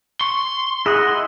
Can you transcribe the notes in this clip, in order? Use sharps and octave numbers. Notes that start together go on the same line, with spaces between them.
C6 C#6
E4 G#4 D#5 F#5